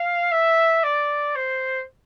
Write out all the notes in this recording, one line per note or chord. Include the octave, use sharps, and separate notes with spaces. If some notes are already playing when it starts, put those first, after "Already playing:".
Already playing: F5
E5
D5
C5